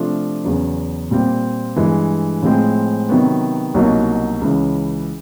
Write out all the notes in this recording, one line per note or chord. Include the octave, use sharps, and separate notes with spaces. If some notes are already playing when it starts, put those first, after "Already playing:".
Already playing: C3 F3 A3 D4 F4
E2 C#3 F#3 B3
A#2 G3 C4
G2 E3 G#3
A2 F3 G#3 C4
C3 D#3 F#3 B3
C2 B2 F#3 A#3 D#4
C#2 C#3 E3